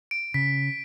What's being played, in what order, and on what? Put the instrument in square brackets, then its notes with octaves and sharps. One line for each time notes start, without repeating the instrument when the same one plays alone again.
[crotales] D7
[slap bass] C#3 [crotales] B6